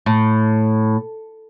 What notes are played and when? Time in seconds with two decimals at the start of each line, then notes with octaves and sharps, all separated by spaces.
0.06 A2